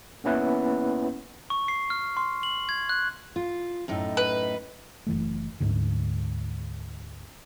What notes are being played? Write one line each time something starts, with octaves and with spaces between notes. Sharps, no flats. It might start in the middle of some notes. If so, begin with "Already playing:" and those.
A#3 B3 C#4 E4 B4 F#5
C#6
C7
F6
C6
F#7
G#6
F#6
F4
F#2 A2 D#4
B4
F#1 E3 A3
D2 G#2 D3